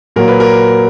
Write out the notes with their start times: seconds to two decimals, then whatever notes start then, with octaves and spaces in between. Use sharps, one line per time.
0.16 A#2 F#3 A#4
0.28 B4
0.40 A#4